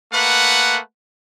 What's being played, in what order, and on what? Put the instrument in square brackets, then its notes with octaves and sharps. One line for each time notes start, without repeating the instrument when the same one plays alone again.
[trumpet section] A3 A#3 B4 F#5